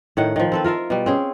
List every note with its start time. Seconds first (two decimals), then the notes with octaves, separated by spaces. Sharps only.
0.17 A2 D#3 F#5
0.36 D#3 F3
0.52 C4 A4 B4
0.64 F4 A#4 E5 F5
0.90 B2 G3
1.06 C4 C#4 G#4